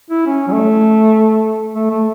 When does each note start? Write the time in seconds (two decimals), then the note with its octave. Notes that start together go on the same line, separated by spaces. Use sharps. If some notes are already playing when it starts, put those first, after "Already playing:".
0.10 E4
0.27 C#4
0.47 F#3
0.52 A3
1.75 A3
1.91 A3